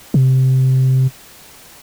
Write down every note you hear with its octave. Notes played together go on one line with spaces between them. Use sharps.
C3